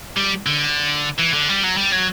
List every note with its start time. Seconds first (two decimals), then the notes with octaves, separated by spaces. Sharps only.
0.17 G3
0.46 D3
1.19 E3
1.34 D3
1.49 G3
1.64 F#3
1.77 G3
1.92 F#3